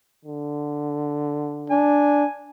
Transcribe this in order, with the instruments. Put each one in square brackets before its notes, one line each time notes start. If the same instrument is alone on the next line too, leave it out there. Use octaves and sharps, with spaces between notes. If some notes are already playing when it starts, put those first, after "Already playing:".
[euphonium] D3
[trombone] D4 [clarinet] G#5